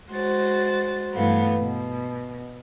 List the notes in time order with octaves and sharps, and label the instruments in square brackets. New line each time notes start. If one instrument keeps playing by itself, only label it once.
[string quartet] G#3 F#4 C5 A6
G2 E3 A3 B3 F5
B2